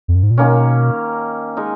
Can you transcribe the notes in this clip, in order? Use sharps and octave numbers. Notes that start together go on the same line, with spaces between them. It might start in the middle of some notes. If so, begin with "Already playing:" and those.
F2
F#2
G#2
A#2
B2 D#3 A#3 C#4
G#3 D#4 A#4